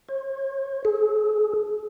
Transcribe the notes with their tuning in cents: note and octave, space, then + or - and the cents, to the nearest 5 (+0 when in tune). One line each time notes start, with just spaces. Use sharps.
C#5 -45
G#4 +40